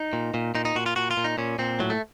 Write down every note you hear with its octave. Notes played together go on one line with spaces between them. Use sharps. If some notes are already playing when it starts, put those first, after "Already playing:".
Already playing: D#4
A#2
A#2
A#2 D#4
D#4
A#2 F#4
F4
A#2 F#4
F4
A#2
D#4
A#2 C#4
A#2 C4
A2 F#3
A3